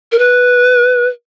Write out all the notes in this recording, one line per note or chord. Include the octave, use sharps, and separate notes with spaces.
A#4
B4